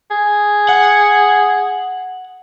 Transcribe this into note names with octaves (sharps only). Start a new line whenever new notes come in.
G#4
F#5